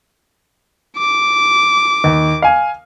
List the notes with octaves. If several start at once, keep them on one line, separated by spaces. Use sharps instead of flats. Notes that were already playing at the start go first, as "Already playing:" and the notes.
D6
D#2
F5 G#5